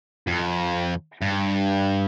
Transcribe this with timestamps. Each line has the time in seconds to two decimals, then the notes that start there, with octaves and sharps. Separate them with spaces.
0.27 F2
1.22 G2